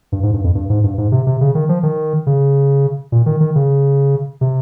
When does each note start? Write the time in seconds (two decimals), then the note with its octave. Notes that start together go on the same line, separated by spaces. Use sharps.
0.12 G2
0.23 G#2
0.33 G2
0.44 F2
0.55 G2
0.70 G#2
0.84 G2
0.98 G#2
1.12 C3
1.27 C3
1.41 C#3
1.55 D#3
1.69 F3
1.83 D#3
2.27 C#3
3.12 A#2
3.26 D#3
3.40 D#3
3.55 C#3
4.41 C3